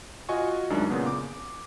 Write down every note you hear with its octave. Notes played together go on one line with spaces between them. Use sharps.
F4 F#4 D#5 G#5 C#6
F#2 D#3 G#3 D4
A#2 C#3 B3
D6